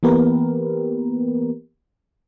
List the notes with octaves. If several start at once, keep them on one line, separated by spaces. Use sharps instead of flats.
E3 A#3 B3 G4 A#4 B4